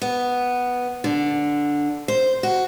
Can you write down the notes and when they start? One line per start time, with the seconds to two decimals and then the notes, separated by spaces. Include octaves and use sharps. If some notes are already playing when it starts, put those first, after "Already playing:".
0.02 B3
1.04 D3
2.08 C5
2.43 F#4